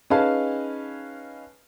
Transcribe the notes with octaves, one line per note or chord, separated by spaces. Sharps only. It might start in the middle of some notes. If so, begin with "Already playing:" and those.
C#4 D#4 G#4 B4 F5 A5